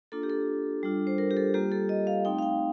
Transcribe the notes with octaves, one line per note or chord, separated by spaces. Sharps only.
A#3 D4 F4 A4
G4
A4
G3 D4 F4
C5
A#4
G4
A4
G3 A#3 F4 G4
A4
D#5
F5
A3 C4 D#4 G5
F5
G5